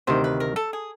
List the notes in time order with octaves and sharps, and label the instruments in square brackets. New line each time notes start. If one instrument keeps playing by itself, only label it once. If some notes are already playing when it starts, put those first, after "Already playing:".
[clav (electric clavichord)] D2 C3 D#3 [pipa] C5
[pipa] B4
A#4
A4
G#4